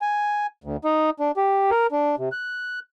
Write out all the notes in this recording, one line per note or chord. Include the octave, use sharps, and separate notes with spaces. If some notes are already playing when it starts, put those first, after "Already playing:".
G#5
D2
D#4
D4
G4
A#4
D4
C3
F#6